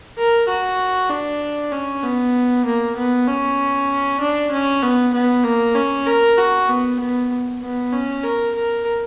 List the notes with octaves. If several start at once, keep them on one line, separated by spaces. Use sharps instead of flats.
A#4
F#4
D4
C#4
B3
A#3
B3
C#4
D4
C#4
B3
B3
A#3
C#4
A#4
F#4
B3
B3
B3
C#4
A#4
A#4